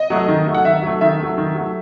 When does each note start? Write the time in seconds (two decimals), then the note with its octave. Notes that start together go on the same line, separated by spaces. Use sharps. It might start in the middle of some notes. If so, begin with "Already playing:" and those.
Already playing: D#5
0.10 F#3 A3
0.28 D#3
0.46 F#3 A3
0.54 F#5
0.65 D#3 E5
0.83 F#3 A3
1.01 D#3 E5
1.19 F#3 A3
1.38 D#3
1.55 F#3 A3